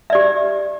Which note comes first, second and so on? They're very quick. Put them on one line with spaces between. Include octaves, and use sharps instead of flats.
E5 D5 G4